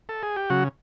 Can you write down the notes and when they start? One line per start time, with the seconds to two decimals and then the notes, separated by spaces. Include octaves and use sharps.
0.09 A4
0.23 G#4
0.36 G4
0.50 C#3 F#3 F#4